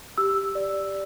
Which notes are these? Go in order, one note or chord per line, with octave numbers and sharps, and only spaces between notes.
G4 E6
D5